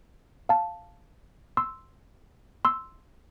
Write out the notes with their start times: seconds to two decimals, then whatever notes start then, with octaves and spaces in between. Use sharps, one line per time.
0.49 F5 A5
1.57 C6 E6
2.65 C6 E6